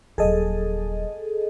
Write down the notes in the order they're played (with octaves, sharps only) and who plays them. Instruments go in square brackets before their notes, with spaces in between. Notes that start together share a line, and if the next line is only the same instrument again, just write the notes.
[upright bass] D#1 F#3 [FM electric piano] G#4 A4 D#5